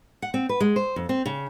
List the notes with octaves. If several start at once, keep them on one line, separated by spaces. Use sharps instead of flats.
F#5
C4
B4
G#3
C5
F2
C4
C#3